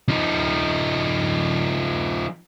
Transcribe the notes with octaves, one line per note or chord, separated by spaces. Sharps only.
F3 D#4